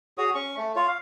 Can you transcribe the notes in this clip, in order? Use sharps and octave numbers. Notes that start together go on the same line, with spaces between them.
F#4 G#4 C#5 D#6
C#4 C#6
A3
F4 C#5
F5